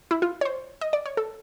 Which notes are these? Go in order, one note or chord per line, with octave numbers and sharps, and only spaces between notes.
E4
F4
C#5
C5
D#5
D5
C#5
A4